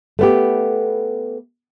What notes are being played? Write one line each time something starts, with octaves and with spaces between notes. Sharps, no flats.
A3 B3 G4